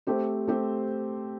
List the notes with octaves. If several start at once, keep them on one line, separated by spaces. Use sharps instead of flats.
A3 C4 G4 C5
A3 C4 G4 C5